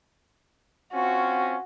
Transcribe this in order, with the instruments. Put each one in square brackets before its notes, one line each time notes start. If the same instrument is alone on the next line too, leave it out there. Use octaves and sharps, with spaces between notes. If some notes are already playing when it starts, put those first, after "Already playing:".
[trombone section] C4 C#4 F4 [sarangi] F#4